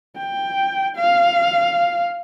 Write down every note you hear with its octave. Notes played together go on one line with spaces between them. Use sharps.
G5
F5